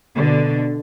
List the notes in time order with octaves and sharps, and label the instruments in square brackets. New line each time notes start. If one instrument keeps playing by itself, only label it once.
[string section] B2 D3